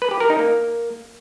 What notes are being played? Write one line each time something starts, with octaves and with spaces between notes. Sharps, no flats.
B4
G4
A#4
D#4
A#3